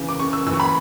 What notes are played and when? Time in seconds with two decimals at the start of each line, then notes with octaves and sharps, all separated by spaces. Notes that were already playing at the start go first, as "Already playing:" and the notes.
Already playing: C#3 E3
0.09 D6
0.19 C#3 C#6
0.33 E6
0.47 E3 E6
0.54 C#6
0.60 B5